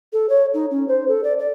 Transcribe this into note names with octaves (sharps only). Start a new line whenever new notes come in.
A4
C#5
D#4
C#4
C5
A4
D5
D5